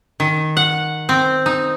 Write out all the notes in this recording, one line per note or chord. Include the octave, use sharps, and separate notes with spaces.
D#3
F#5
C4
D#4